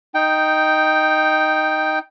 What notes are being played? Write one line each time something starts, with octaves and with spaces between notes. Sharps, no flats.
D#4 G5